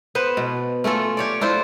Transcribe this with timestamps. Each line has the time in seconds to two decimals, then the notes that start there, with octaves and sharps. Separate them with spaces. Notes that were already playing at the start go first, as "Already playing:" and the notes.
0.15 B3 B4 C5
0.37 B2
0.84 A3 C#4 F4 A4
1.17 G4 C#5 D5
1.41 D4 E4 F4 C5